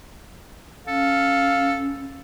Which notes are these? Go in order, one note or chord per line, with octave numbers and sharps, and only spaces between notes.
C#4 A4 F5